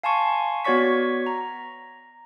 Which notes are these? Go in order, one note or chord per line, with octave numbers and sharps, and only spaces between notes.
F5 G#5 A5 C6 C#6
B3 F#4 C#5 D5 C#6 B6
A#5